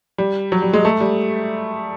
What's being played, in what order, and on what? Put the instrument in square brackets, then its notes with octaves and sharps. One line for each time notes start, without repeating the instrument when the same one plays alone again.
[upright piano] G3
F#3
G3
G#3
A3
G3